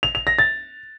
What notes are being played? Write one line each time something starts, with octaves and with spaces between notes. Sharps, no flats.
F7
F7
A#6
A6